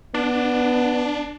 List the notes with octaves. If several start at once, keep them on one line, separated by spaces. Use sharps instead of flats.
B3 D4